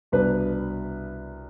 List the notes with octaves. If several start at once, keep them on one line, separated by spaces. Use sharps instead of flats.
C2 B2 B3 D4 B4